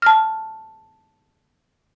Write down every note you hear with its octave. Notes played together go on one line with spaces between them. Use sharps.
A5 F6